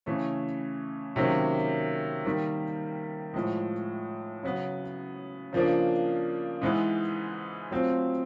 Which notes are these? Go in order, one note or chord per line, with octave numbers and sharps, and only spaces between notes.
C#3 E3 A3 C#4
C3 D#3 F#3 A#3 C#4
D#3 G3 A#3
A2 F3 G#3
C#3 F#3 B3
C#3 F3 A#3 D4
G#2 E3 G#3 B3 E4
F#3 A3 C4 F4